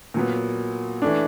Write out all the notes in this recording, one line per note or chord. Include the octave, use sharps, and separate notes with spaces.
A#2 F#3 B3
E3 A3 D4